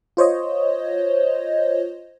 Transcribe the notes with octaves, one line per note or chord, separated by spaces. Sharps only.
F4 C5 C#5 D#5